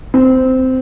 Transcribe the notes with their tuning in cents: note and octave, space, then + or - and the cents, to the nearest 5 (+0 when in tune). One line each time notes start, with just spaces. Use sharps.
C4 -15